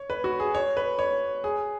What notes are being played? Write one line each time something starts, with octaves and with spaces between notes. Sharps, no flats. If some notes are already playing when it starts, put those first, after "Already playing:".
Already playing: C#5
B4
F#4
G#4
C#5
B4
C#5
G#4